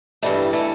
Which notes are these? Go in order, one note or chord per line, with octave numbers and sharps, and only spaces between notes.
G2 E3 G3 A3
E3 G3 A3